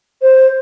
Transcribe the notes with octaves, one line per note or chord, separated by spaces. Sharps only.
C5